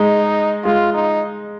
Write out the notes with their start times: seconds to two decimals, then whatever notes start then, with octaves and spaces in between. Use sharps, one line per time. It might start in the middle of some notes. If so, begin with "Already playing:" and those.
Already playing: G#3 D#4
0.64 G#3 F4
0.94 D#4